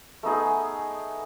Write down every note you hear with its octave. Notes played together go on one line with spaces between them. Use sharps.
A3 B3 D#4 G#4